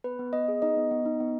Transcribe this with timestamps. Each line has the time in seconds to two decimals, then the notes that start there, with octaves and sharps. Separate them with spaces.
0.04 B3 B4
0.19 B3
0.33 B3 D#5
0.48 G#4
0.62 D#4 D#5
0.77 B3
0.91 B3
1.06 D#4
1.20 B3